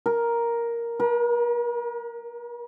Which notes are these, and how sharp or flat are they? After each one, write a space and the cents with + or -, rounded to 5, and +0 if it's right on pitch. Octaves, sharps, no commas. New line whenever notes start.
A#4 +5
A#4 +45